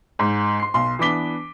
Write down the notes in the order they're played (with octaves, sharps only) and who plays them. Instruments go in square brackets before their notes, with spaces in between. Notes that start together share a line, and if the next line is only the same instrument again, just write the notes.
[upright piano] G#2
C6 C7
B1 C6
E3 B3 D4 D6 B6 G7